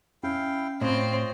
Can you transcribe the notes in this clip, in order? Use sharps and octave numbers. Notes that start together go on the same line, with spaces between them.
C#4 E4 F5 G5
A2 C4 F4 C5 C#5 D#5